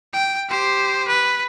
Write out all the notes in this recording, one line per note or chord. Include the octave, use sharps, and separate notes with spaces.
G5
G4 C5
B4